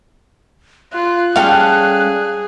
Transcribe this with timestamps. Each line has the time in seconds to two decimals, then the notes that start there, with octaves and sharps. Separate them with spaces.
0.93 F4 F#6
1.36 G3 C#4 G#4 A4 F5 G5